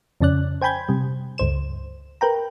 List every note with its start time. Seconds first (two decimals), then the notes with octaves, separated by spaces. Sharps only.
0.21 F2 C#3 C#4 D5 F#6
0.61 C5 G5 G#5 B5 G6 G#6
0.89 C3 G3
1.38 C#2 G2 C5 E7
2.21 A#4 B4 G5 A#5